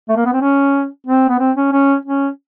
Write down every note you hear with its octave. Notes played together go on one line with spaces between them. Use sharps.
A3
A#3
B3
C4
C#4
C4
B3
C4
C#4
C#4
C#4